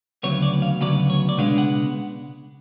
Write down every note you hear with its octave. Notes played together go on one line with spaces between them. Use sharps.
D2 C#3 F#3 B3 C#5
D5
F5
D2 C#3 F#3 B3 D5
C#5
D5
C#2 B2 G#3 B3 D4 F5
F#5